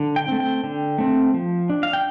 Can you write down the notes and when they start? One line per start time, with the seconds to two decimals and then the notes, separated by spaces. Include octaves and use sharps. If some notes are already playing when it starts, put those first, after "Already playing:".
Already playing: D3
0.16 G5
0.28 A3 C4
0.40 G5
0.64 D3
0.98 A3 C4
1.34 F3
1.70 D4
1.83 F5
1.93 G5